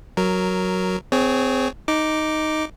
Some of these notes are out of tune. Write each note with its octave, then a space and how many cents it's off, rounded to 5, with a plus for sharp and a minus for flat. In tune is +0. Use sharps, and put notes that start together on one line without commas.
F#3 +0 A#4 +0
C4 -25 G#4 +0 C#5 +0
D#4 +0 D6 +0